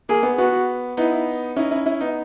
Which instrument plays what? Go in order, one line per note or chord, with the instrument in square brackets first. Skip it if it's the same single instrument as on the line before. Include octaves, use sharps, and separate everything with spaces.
[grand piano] A#3 [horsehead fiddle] G#4
[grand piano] B3
[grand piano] B3 [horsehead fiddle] F#4
[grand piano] B3 D#4 [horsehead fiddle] E4
[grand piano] C#4 E4 [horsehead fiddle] D#4
[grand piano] C#4 E4
C#4 E4
B3 D#4